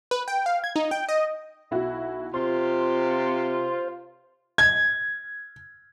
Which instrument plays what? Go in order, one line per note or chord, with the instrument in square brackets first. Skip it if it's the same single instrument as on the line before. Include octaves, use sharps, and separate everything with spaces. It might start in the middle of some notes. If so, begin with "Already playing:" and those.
[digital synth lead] B4
G5
F5
G#6
D#4
G5
D#5
[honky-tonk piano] B1 E4 F#4
[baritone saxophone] C3 [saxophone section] F4 [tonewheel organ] C5 [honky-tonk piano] C6
[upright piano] G#6